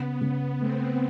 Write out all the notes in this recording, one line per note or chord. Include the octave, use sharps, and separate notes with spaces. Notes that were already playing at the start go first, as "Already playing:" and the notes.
Already playing: C#3 B3
C#3 B3
A3 C4